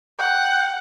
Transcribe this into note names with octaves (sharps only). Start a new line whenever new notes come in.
F#5 G5